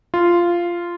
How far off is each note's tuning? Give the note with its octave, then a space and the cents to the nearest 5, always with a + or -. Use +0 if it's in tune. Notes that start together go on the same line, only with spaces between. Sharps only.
F4 -10